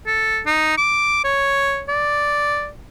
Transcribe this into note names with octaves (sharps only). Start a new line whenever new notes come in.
A4
D#4
D6
C#5
D5